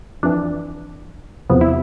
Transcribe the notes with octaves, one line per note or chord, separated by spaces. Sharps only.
F2 E3 D4
E2 C3 F3 B3
E4